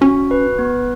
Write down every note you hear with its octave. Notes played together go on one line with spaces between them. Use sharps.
C#4 F#4
B4
B3